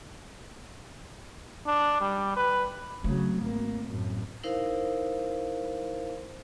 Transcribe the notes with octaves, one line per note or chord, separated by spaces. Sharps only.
D4
G3
B4
C#3 F#3 A3 C4
G#1 A#3
F#2 A2
D#4 E4 A#4 C5 F5